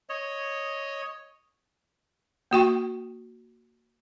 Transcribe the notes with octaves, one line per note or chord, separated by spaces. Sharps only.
C#5 D#5
A#3 F#4 G5 C#6